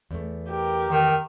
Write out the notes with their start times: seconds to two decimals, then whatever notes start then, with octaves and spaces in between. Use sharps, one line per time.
0.11 E2 A3
0.48 G4 A#4
0.88 D#3